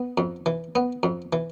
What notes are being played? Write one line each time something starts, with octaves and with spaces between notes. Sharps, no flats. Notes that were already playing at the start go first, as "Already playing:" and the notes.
Already playing: B3
F2
E3
B3
F2
E3